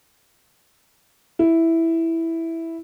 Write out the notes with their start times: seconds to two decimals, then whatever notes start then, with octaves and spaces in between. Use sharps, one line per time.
1.39 E4